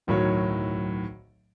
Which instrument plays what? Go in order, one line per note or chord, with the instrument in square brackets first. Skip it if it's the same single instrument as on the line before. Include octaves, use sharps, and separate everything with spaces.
[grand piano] D1 B1 A2 D#3 F#3 C#5